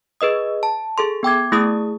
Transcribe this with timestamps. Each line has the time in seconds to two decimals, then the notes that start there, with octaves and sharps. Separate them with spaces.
0.21 G#4 B4 D#5 D#6
0.63 A5
0.98 G#4 A4 C6
1.23 B3 G5 D6 G#6
1.52 A3 E4 G#4 D#6